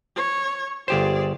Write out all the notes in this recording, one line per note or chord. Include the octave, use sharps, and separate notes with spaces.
C#5
G1 G4 G#4 C5 D5